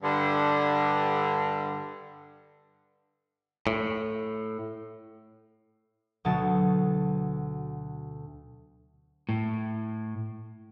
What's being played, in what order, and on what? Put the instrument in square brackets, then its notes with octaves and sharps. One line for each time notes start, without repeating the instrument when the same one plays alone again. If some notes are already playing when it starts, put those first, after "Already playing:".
[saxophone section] G2 D3
[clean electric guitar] A2
[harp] D2 B2 F#3 A5
[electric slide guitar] A2